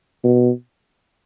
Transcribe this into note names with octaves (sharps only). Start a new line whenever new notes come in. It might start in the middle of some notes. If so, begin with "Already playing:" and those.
B2